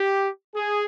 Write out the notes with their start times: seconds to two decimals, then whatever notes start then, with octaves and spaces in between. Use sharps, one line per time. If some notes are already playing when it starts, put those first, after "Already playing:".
Already playing: G4
0.55 G#4